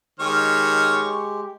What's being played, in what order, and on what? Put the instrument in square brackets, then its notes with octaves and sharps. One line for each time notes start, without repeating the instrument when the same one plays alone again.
[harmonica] D#3 C#5 F6 [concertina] G#3 G4 [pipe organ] C#6